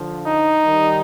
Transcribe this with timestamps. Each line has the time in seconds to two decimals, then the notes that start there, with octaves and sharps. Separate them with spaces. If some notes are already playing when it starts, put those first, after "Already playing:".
Already playing: D3 F3
0.26 D#4
0.64 D#3 G3